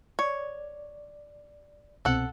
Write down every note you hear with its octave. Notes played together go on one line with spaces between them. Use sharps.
C#5 D5
C2 B2 C4 A4 F#5